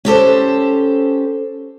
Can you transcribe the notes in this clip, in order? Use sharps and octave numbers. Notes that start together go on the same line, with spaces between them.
C#4 G4 A4 C5